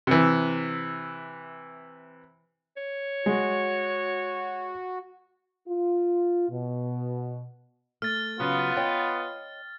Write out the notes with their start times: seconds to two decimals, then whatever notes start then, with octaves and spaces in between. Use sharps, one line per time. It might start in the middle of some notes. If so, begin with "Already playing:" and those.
0.07 C3 E3
2.77 C#5
3.26 G#3 F#4
5.67 F4
6.49 B2
8.02 A3 F6 A6
8.40 C#3 F#3 B3 F4
8.76 C#5 D#5 G5